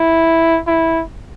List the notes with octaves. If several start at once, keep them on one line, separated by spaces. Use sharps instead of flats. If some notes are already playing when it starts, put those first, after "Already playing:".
Already playing: E4
E4